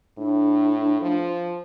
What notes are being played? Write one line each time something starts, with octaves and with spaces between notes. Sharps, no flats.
A2 D4
F3